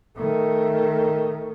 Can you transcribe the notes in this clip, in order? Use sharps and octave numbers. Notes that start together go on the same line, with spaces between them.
D#3 A3